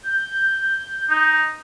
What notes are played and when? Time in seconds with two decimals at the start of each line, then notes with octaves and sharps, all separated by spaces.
0.03 G6
1.10 D#4